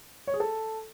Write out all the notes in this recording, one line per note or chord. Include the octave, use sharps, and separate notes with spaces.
C#5
G#4
A4